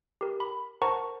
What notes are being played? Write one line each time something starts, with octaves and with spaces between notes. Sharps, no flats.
G4 A#4
B5
A#4 C5 F#5 A5 A#5 C#6